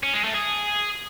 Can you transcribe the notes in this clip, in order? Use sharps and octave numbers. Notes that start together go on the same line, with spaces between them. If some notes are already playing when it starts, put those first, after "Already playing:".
C#4
G#3
A3
G#4